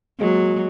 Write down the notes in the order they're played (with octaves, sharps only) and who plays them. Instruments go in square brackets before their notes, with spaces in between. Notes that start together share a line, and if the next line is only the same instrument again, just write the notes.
[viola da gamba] F#3 [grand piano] G#3 A#3